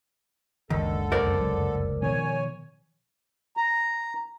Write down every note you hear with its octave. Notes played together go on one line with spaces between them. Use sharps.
F#1 C#2 D3 D#3 A4
B1 F2 A#4 C5 D5
F1 B1 F#3
B2 D#3 F3 C#5 G#5
A#5